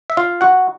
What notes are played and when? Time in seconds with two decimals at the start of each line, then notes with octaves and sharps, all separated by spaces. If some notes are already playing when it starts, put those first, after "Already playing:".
0.10 E5
0.17 F4 F5
0.41 F#4 F#5